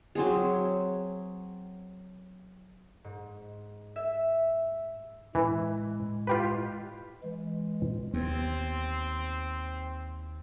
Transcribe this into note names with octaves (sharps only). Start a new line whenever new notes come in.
F#3 C4 G#4
G#2
E5
A2 E3 G#3
F4 G4 B4
E3 G#3
D#2 B3 C4